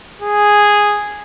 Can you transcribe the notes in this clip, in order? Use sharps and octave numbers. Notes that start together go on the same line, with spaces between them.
G#4